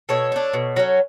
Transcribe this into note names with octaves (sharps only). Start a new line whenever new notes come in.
B2 A4 C#5
A3 D4
B2
F#3 C#4